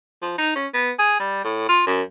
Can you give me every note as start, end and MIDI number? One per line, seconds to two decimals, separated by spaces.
0.22 0.37 53
0.38 0.52 63
0.56 0.67 61
0.74 0.91 59
0.99 1.19 68
1.20 1.43 55
1.44 1.65 45
1.68 1.83 65
1.87 2.02 42